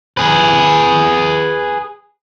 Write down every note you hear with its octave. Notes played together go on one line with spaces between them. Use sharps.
G#4 B4